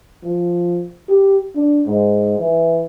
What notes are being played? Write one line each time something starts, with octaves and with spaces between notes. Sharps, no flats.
F3
G4
D4
G#2
E3